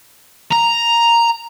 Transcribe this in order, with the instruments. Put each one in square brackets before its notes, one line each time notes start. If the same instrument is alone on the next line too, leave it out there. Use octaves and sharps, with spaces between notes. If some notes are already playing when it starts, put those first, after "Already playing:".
[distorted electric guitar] A#5